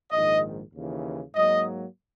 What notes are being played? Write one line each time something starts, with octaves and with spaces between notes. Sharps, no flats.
A#1 G#2 D#3 D#5
D#2 C#3 E3
G#2 F#3 A#3 D#5